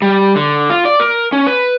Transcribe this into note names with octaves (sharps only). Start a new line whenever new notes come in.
G3
D3
F4
D5
A#4
C#4
B4